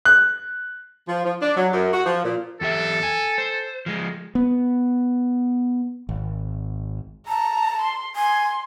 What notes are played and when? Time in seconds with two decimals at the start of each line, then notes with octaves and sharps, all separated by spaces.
0.05 F#6
1.09 F3
1.25 F3
1.42 D4
1.57 F#3
1.73 F#2
1.93 F#4
2.06 F3
2.25 A#2
2.61 E2 G4 A4 E5
3.03 G#5
3.38 C5
3.86 F3 G#3
4.35 B3
6.09 G#1
7.28 A5 A#5
7.82 C6
8.16 G#5 C6